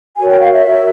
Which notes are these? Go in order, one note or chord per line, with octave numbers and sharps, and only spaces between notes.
F#4 A#4 C#5 G#5
G5
F5
E5
F#4 A#4 C#5